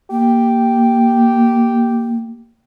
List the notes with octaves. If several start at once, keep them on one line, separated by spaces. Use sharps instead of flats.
A#3 G4